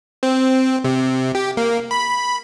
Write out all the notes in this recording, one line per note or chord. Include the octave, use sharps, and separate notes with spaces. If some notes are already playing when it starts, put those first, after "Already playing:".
C4
C3
G4
A#3
B5